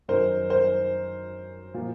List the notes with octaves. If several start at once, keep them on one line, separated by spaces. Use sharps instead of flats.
F#2 D#3 A#4 C5
A#4 C5
A#2 F3